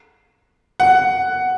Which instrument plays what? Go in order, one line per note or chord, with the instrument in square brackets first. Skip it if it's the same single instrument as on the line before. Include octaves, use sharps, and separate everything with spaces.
[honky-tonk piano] F#5